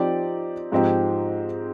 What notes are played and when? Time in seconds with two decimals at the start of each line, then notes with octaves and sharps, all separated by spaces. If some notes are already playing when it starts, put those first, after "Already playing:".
Already playing: F3 C4 D#4 G4 D5
0.72 G#2 F3 C4 D#4 G4